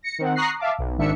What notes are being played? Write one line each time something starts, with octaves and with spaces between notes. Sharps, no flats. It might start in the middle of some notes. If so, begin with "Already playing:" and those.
A#6 C#7
D#3 C4 F#5
A#5 C#6 D#6 F#6 A#6 C7
E5 F5 A5 D6
B1
G#1 G#2 D#3 D4 E5 C#7